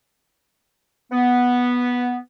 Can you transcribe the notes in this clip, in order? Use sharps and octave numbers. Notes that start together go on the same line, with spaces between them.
B3